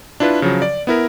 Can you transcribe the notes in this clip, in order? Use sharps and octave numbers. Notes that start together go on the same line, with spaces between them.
D4 E4 F4 B4
C#3 F3 F#3
D5
B3 E4 A#4